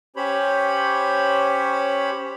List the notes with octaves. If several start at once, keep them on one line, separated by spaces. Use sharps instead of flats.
C#4 G4 C5 C#5 B5